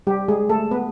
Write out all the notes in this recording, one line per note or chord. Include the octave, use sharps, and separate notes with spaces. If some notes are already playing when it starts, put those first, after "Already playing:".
G3 G4
G#3 G#4
A3 A4
B3 B4